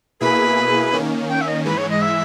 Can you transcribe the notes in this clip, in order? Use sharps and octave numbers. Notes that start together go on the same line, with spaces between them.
B2 A#3 E4 G#4 B4
D#3 A#3 C#4
G5
E5
D#5
G#2 E3 G#3 B4
C#5
D#5
E5